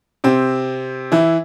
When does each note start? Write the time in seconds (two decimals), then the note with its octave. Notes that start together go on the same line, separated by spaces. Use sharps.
0.24 C3 C4
1.12 E3 E4